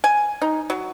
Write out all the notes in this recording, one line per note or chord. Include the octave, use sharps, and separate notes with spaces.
G#5
D#4
F#3